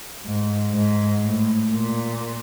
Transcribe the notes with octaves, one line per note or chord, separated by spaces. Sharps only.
G#2
G#2
A2
A#2